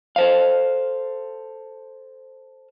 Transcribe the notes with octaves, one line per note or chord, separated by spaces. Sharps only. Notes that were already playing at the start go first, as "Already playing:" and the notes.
A4 C5 F5